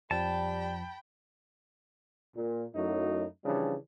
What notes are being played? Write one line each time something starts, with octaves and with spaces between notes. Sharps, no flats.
F2 F3 G3 G5 A5 B5
A#2
F#2 F#3 A3 D#4 E4
C#3 E3 F3 G3 D4